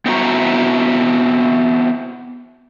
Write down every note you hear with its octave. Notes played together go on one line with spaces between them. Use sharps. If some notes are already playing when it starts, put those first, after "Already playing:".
B3 C4 E4 F#4 A#5